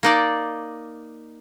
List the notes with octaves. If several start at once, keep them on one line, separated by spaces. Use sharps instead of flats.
A#3 D#4 D5